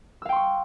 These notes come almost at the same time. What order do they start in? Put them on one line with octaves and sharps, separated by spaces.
E6 F5 G5 C6 C#6